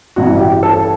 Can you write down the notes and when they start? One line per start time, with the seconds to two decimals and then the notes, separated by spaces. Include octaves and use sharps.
0.16 A1 G2 E3 F#4
0.39 G4
0.63 A4